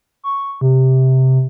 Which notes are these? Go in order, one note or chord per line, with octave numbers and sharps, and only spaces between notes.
C#6
C3